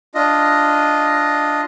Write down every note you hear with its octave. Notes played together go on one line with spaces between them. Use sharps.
D4 F4 D#5